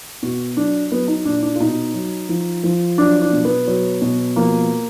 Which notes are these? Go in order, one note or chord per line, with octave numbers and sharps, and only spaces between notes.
B2 F#4
F#3 D4
F#3 B3
D#4
A#2 D4
D4
F4
B2 D#4
F#3
F3
F3
F#3 D4
D4
B2
B3
F#3
B2
F3 A#3